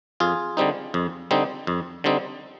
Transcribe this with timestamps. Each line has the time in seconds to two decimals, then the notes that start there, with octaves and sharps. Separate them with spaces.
0.20 F2 F4 G#4
0.57 D3 G3 C4 D#4
0.94 F2
1.31 D3 G3 C4 D#4
1.67 F2
2.04 D3 G3 C4 D#4